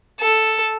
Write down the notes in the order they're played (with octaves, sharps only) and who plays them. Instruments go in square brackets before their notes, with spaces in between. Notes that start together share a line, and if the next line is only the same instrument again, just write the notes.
[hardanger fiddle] A4